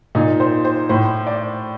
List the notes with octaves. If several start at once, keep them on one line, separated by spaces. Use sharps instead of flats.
A#2 D#4
C5
C5
A2 C5
D5